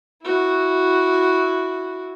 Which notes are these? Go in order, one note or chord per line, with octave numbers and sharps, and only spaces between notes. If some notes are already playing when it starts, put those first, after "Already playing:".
E4 F#4